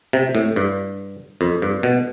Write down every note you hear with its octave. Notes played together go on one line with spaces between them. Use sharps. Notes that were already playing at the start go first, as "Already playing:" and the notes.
C3
A2
G2
F2
G2
B2